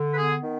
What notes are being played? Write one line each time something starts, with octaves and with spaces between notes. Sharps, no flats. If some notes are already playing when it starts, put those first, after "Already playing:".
Already playing: D3
B4
B3 G#4
D#3